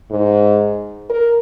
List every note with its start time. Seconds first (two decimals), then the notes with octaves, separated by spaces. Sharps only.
0.11 G#2
1.10 A#4